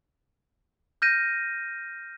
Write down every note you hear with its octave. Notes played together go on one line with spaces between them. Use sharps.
F6 G6 A#6 D#7